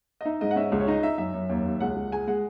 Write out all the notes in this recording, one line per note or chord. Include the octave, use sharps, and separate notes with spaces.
D#5
D#4 E5
G#2 D#5
F#5
C#4 E5
C#2
C#5
D#4 D#5
D#4 E5
F#2 E5
F#2
D#2
D#2
C#2 F#5
C#2
G#3 G#5
G#3 F#5